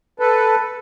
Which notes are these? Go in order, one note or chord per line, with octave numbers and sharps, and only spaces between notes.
A4 B4